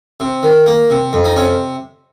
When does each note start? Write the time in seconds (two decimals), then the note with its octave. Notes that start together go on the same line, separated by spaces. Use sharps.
0.20 C3
0.43 D#3
0.66 A#3
0.90 C3
1.13 F2
1.25 D#4
1.36 C3 C#4